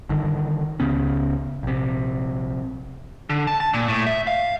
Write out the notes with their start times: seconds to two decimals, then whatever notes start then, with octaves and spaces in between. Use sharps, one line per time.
0.09 G1 G2 D3 D#3
0.80 C#2 C#3 B3 C#4
1.63 A#1 C3
3.30 D3
3.47 A5
3.60 A5
3.74 A#2
3.88 A2
4.07 E5
4.27 F5